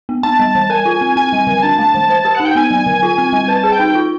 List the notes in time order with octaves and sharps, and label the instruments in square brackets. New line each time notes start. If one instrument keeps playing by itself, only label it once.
[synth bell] B3
[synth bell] B3 [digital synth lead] A5
[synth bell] G3
E3
[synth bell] A#4 [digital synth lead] G#5
[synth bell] F4
C4
[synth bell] C4 [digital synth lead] G#5
[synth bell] G3
D3
[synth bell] D4 [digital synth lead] A5
[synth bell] A3
E3
C5
G4
[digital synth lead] F#5
[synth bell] D#4
[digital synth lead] G5
[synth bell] B3 [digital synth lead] G#5
[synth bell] F#3
D3
F4
C4
G3
[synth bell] B4 [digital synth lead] A5
[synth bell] G#4
[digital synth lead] G5
[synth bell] D#4
F4